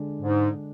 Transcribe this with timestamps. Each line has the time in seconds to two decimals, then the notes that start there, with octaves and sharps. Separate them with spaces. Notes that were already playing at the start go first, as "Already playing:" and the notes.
Already playing: D3 G#3 D4
0.21 G#2